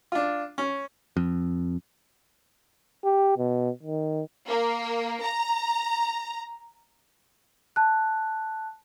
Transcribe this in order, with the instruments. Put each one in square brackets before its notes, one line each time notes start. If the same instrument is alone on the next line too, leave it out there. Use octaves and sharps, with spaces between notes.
[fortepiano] D4 F4
C#4
[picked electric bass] F2
[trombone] G4
B2
D#3
[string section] A#3
A#5
[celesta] A5 F#6